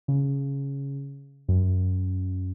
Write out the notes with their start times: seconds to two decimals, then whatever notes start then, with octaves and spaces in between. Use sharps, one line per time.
0.08 C#3
1.48 F#2